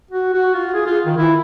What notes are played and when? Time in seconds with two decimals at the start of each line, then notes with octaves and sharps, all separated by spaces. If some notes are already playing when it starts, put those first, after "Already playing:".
0.11 F#4
0.33 F#4
0.54 F4
0.74 G#4
0.86 F4
1.06 D#3
1.18 E4